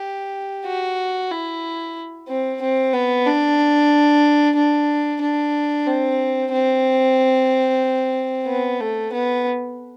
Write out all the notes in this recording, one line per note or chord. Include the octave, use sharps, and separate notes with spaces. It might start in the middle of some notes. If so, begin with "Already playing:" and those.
Already playing: G4
F#4
E4
C4
C4
B3
D4
D4
D4
C4
C4
B3
A3
B3